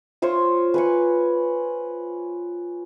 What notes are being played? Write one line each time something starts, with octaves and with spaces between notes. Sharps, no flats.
F4 C5 C#5 C#6
B4 G#5 C#6